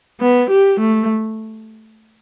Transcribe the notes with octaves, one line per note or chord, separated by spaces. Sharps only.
B3
G4
A3